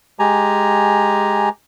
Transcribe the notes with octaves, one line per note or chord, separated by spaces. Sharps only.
G#3 G4 G#5 A#5